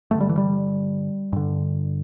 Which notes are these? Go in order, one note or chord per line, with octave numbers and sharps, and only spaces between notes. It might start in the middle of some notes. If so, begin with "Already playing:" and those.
G2 D3 A3
G3
E3
G3
G2 D3